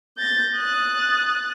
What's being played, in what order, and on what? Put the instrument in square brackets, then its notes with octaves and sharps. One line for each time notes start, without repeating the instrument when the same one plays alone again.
[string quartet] G6 A6 A#6
D#6 F#6 A6